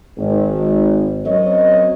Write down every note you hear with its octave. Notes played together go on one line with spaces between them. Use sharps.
G#1
F#3 C4 C#4 A#4 C#5 D#5